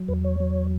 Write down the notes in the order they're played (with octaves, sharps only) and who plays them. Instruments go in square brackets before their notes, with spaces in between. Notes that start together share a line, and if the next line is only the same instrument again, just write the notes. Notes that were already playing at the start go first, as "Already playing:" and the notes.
Already playing: [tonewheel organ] F#3
E2 B4
C#5
F#3